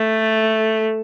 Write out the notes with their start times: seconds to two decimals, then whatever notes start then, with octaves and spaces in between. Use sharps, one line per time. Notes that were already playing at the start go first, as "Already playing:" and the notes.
Already playing: A3